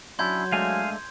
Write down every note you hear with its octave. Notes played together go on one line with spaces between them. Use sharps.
F#3 C#4 D4 E4 C6 G6 G#6
G#3 A3 D4 F5 G#5